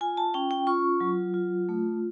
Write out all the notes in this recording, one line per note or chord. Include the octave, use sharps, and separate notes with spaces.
F4 G#5
A5
C#4 G5
G5
F4 C#6
F#3
F4
A3